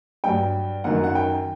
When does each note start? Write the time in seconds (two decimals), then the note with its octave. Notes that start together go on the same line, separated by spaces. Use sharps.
0.24 G2 F#3 G5
0.84 F#2 D#3 F#3 F#5
1.04 F#5
1.15 G5